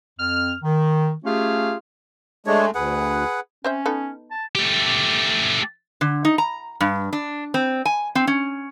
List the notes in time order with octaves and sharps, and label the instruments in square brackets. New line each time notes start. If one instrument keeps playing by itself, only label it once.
[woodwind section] F2 F6
D#3
A3 C#4 F4 G4 G#4 F5
[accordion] G#3 A3 [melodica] D4 C#5
[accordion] D2 [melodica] G#4 B4 F#5
[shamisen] C4 C5 E5 [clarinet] C#4
[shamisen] B3 D#4 A4
[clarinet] A5
[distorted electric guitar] A3 G4
[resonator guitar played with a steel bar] D3
D#4
A#5
G2
D4
C4
G#5
C4
C#4